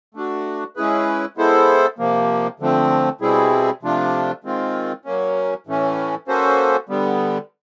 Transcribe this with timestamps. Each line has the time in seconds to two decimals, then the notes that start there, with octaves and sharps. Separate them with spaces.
0.15 A3 D4 F#4
0.76 G#3 C#4 E4 G#4 B4
1.37 G#3 B3 E4 A4 C5
1.98 C3 F3 A#3
2.60 D3 F3 A3 C4
3.21 B2 G3 C4 E4 G#4
3.83 C3 F3 A3 D4 F4
4.44 D#3 G#3 C4 F4
5.05 F#3 A#3 C#4
5.67 A2 E3 A3 C#4
6.28 A#3 C#4 F#4 A4 C5
6.89 D3 G3 B3